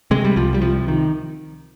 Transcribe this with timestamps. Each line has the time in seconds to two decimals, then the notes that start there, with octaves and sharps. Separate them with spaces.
0.11 C3 G#3
0.25 G3
0.36 C2 F3
0.54 G3
0.61 C3 F3
0.88 D#3